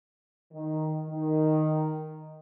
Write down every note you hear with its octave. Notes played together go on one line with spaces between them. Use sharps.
D#3
D#3